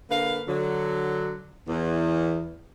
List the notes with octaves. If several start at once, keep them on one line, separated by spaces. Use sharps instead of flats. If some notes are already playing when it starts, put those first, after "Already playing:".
D3 A#3 B4 F5
D3 F#3
E2